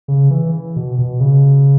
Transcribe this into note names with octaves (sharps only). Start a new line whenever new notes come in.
C#3
E3
B2
B2
C#3